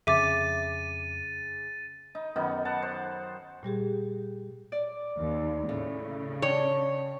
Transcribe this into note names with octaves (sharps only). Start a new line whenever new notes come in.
F2 C#3 E5 D6 A6 D#7
D#4
F#2 D#3 B3 D#4
B4 F#5 A5
C5
A#2 G3 G4 G#4
D5
D#2
A2 C#3
D4 C#5 G5